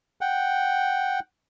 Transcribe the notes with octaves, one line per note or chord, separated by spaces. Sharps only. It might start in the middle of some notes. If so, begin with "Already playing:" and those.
F#5 G5